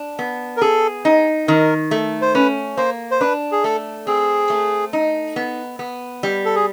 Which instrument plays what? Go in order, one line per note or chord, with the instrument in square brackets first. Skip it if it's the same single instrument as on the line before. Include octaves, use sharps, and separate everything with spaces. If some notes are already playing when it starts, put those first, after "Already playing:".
Already playing: [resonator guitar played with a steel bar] D4
B3
[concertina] A#4
[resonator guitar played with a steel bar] G#4 [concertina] A4
[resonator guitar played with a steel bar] D#4
[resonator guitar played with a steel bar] D#3 [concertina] A#4
[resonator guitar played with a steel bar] A3
[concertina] C5
[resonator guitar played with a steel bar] C#4 [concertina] B4
[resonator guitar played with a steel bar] A#3 [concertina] C5
[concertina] C5
[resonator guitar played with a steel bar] D4 [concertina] B4
[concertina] G#4
[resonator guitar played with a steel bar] A3 [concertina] A4
[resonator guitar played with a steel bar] C4 [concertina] G#4
[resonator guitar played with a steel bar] A3
D#4
B3
B3
G3
[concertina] A4
G#4